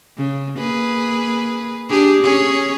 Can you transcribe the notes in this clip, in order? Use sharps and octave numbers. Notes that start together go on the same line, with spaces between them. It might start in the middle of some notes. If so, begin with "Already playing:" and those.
C#3
A#3 G#4 B4
D4 G4 G#4
C#4 G#4 C#5